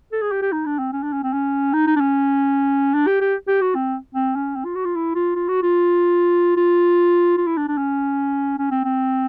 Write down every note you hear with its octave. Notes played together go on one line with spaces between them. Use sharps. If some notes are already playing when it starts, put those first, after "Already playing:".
A4
G#4
G4
G4
D#4
D4
C4
C#4
D4
C#4
C4
C#4
D#4
D#4
D4
C#4
D4
G4
G4
G4
F#4
C4
C4
C#4
C4
F4
F#4
F4
E4
F4
F4
F#4
F4
F4
F4
E4
D4
D4
C#4
C#4
C4
C4